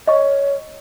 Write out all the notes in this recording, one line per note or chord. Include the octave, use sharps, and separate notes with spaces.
C#5 D#5 C#6